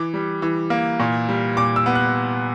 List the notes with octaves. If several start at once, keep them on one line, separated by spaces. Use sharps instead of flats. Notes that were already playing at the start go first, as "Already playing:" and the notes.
Already playing: E3 D6
G3
E3
A#3
A#2
G3
A#2 D6
E6
B3
F#6